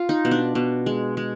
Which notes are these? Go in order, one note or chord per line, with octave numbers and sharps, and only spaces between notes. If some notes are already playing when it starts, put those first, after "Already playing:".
Already playing: F4
D#4
B2
D4
B2
G#3
G#3